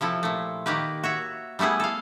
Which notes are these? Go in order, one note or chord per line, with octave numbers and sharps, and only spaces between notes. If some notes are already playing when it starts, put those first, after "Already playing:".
C3 F3 E4 A4
A#2 A3
D#3 A#3 G4 B4
F#4 C#5 E5
G3 A3 B3 E4 G#4
A4 F5